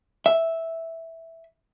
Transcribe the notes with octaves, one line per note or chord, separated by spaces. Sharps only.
E5